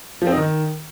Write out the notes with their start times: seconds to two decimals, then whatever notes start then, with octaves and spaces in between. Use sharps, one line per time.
0.22 F3
0.27 C4
0.32 D#4
0.37 D#3